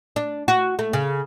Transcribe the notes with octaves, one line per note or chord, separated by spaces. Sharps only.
D4
F#4
A3
C#3